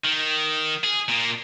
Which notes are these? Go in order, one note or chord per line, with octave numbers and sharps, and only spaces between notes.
D#3
G#4
A#2 A#3